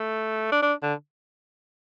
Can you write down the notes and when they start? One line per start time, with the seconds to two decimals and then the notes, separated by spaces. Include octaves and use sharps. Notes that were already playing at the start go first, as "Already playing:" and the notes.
Already playing: A3
0.52 D4
0.62 D4
0.82 D3